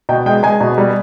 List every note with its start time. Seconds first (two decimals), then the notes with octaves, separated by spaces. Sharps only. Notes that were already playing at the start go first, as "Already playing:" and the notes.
0.09 B2 G5
0.26 G#3 G5
0.43 G#3 G#5
0.61 B2
0.78 G3